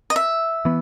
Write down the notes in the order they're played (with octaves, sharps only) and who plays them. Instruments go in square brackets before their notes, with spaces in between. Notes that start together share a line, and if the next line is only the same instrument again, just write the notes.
[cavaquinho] D#5
E5
[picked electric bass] E3 B3